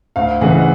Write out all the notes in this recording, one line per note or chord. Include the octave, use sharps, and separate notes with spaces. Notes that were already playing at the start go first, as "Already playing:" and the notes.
D2 F5
C#3 E3 A3 F#5
F#5